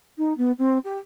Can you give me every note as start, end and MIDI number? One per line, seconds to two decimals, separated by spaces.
0.18 0.33 63
0.37 0.51 59
0.58 0.78 60
0.84 0.99 67